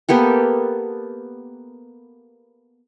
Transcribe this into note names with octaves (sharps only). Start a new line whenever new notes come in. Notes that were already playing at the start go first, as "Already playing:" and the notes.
A#3 B3 G4 A4